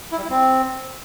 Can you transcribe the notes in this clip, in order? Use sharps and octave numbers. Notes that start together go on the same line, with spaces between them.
E4
G3
E4
C4